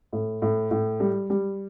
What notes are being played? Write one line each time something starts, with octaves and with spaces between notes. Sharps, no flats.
A2
A2
A2
G3
G3